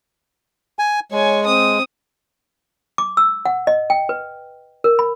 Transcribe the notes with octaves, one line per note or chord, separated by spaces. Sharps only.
G#5
G#3 C#5 G#5
C4 D#6
D6
E6
F#5
D#5
G5
B4
A#4
B5